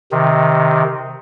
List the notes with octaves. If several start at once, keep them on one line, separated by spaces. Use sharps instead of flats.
C3 D#3